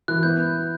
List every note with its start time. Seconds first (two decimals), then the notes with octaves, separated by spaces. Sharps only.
0.08 E3 F#6
0.23 B3 G6